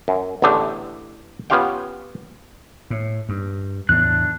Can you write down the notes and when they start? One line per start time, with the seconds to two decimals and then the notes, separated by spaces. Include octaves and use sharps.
0.08 F#2
0.42 A1 E2 D3 A3 D4 G4
1.50 B3 C#4 F4 G4 F5 G5
2.90 A2
3.29 G2
3.89 E2 A2 E3 D4 F#6